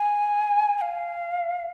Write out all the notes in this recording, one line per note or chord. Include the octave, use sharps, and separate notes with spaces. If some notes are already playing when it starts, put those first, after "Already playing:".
Already playing: G#5
G#5
F5